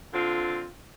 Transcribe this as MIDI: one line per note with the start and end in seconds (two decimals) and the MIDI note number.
0.13 0.67 50
0.13 0.67 60
0.13 0.67 65